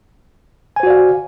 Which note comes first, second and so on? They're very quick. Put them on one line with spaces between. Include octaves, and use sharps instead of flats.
G#5 C5 F#4 D5 F5